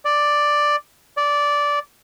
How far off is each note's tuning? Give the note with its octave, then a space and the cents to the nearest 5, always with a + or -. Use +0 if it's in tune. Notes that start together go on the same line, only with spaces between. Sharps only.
D5 +5
D5 -10